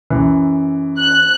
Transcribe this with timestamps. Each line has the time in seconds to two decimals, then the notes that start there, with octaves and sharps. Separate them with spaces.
0.10 F#2 E3
0.98 F#6